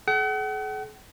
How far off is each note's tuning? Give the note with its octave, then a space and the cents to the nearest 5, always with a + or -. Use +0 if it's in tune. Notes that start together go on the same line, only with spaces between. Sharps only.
G#4 +45 F#5 +40